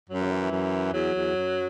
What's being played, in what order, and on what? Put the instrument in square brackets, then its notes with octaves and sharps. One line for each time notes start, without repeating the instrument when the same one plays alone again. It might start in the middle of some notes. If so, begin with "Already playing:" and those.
[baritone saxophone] F#2 [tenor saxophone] F#3
[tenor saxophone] E3
C#3
E3
E3
[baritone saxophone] F#2
[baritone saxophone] E2 [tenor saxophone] F#3
[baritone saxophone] E2
F#2